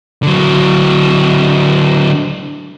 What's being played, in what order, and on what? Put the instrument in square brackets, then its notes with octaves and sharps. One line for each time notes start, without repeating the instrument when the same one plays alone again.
[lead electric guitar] D3 F#3